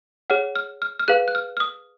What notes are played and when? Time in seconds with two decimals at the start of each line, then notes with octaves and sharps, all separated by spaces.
0.30 G#4 C#5 F#5 F6
0.56 F6
0.82 F6
0.99 F6
1.08 G#4 B4 F5 F#6
1.28 F#6
1.35 F6
1.57 F6
1.60 D#6